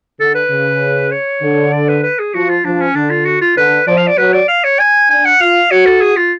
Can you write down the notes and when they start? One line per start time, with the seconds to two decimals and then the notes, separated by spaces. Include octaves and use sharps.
0.20 D3 A4
0.35 B4
0.50 C#3
1.12 C#5
1.42 D3
1.73 D5
1.89 B4
2.03 B4
2.19 G#4
2.34 F3 F#4
2.50 F4
2.64 F3 D4
2.80 C#4
2.95 D3 D4
3.10 F4
3.25 F#4
3.41 F4
3.57 D3 B4
3.87 F3 D5
3.97 F5
4.07 D5
4.18 F#3 B4
4.33 D5
4.48 F5
4.64 C#5
4.79 G#5
5.10 D4 G#5
5.25 F#5
5.40 F4 F5
5.71 F#4 C#5
5.86 A4
6.01 G#4
6.16 F4